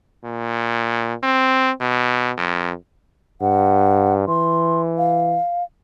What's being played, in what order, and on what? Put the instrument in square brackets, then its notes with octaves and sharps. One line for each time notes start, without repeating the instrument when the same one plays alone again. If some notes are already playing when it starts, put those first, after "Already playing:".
[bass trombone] A#2
C4
B2
F2
[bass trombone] G2 [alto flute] F#5
[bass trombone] E3 [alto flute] C6
[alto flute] F5